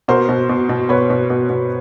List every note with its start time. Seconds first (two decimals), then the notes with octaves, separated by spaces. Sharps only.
0.08 B2 A#4 C5
0.29 B2
0.49 B2
0.69 B2
0.89 B2 B4 C#5
1.10 B2
1.30 B2
1.50 B2